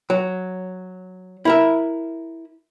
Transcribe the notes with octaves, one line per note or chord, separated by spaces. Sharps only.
F#3
E4 A#4 E5